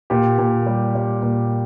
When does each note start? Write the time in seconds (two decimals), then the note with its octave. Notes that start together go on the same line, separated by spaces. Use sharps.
0.10 A#2 G4
0.38 A#2
0.67 G3
0.95 G3
1.23 A#2